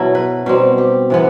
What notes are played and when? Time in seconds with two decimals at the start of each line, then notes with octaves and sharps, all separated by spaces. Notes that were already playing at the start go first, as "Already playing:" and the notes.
Already playing: B2 F#3 E4 A4
0.15 B4
0.46 B2 G3 C4 D#4
0.78 G4
1.10 C3 E3 B3